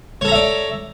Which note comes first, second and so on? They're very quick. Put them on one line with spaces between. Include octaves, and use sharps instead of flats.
C#5 A4 A#5 E5 D5